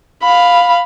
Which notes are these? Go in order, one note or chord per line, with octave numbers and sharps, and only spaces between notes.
F5 B5